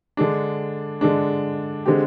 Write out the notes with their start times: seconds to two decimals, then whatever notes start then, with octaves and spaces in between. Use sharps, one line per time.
0.17 D3 G#3 D4
1.01 D3 G#3 D4
1.86 D3 G#3 C4 G4